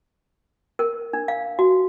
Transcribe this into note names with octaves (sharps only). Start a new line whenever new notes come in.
A#4
D4
F5
F#4